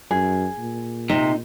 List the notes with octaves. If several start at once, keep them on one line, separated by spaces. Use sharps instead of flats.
F#2 G#4
A#2
C3 D#4